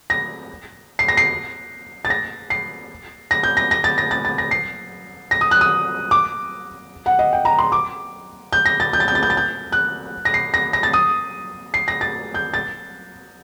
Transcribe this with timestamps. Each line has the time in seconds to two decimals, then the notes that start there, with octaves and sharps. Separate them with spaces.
0.10 A#6
0.99 C7
1.08 A#6
1.17 C7
2.05 A6
2.10 A#6
2.50 C7
3.31 A#6
3.43 G6
3.57 A#6
3.71 A#6
3.84 A6
3.98 A#6
4.11 A6
4.25 A6
4.38 A#6
4.51 C7
5.31 A#6
5.41 D#6
5.51 F#6
5.61 D#6
6.11 D6
7.06 F#5
7.19 D#5
7.33 G5
7.45 A#5
7.59 C6
7.72 D6
8.53 G6
8.66 A#6
8.80 A6
8.93 G6
9.00 A6
9.08 G6
9.15 A6
9.23 G6
9.30 A6
9.37 G6
9.72 F#6
10.25 A#6
10.34 C7
10.54 A#6
10.73 A#6
10.83 A6
10.93 D#6
11.74 C7
11.88 A#6
12.01 A6
12.34 G6
12.54 A6